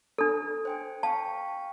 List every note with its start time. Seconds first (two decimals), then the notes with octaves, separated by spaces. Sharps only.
0.18 D4 A4
0.65 C5 G5 G#5
1.03 F5 G5 A5 C#6